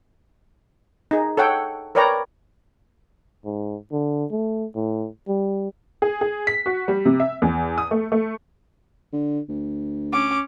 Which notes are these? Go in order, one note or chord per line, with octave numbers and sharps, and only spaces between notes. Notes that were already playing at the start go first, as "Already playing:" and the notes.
D#4 G#4
A4 C#5 F#5 G5
A#4 B4 C#5 D5 G5 A#5
G#2
D3
A3
A2
G3
G#4
G#4
B6
F#4
G3
C3
E5
E2
D#6
A3
A3
D3
D2
C#4 D6